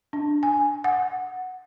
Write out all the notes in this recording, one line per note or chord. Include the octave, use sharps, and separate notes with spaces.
D4
G#5
F#5